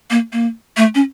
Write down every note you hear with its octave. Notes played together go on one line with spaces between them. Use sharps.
A#3
A#3
A3
C#4